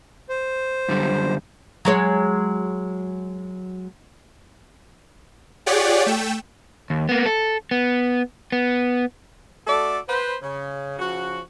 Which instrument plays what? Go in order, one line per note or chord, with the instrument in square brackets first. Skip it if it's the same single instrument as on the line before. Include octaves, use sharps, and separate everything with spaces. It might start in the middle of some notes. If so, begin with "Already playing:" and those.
[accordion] C5
[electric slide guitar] F#2 D3 G3
[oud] F#3 G#3 C#5
[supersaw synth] F4 G4 G#4 C#5 D5 F#5
A3 G5 E7
[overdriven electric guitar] D#2
A#3 B3
A4
B3
B3
[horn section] A3 F#4 A4 D5
B4 C5
C#3
C#3 F3 F#4